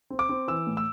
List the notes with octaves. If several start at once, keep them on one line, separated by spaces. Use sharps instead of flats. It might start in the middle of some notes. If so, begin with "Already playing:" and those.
C4
D6
C4
E3 E6
A2
E6